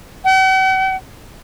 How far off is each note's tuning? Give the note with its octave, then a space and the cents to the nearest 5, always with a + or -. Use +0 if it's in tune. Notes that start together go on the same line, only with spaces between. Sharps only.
F#5 +45